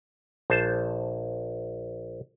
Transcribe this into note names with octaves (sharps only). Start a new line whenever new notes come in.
A#1 C5 A5